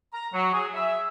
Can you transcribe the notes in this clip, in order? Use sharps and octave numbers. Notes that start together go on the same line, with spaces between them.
A#5
F#3
G#4
E5